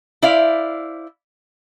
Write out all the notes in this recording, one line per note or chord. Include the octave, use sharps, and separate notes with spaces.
E4 C5 D5 E5 F5